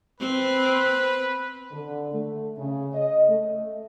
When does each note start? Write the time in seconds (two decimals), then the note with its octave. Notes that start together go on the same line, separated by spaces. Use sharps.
0.20 C4 B4
1.72 D3
2.13 A3
2.58 C#3
2.94 D#5
3.29 A3